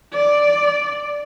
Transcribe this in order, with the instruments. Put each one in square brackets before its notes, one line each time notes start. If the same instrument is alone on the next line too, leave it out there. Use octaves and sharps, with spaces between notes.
[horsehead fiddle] D5